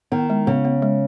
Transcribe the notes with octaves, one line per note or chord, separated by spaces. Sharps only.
D#3 B3
G#3
C#3 B3
B3
G#3